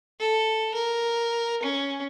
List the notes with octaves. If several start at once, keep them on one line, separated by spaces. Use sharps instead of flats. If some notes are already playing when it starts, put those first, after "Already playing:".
A4
A#4
C#4